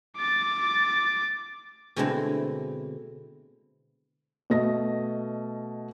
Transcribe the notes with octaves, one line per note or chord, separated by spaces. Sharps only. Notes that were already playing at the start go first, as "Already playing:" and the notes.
D6 A6
B2 D3 G#3 A3 C4 E4
B2 A3 D#5 A#6